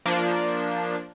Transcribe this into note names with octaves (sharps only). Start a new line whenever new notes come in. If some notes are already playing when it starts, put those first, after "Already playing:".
F3 A#3 D4